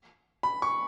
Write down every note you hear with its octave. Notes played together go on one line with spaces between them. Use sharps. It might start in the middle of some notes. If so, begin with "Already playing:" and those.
B5
C#6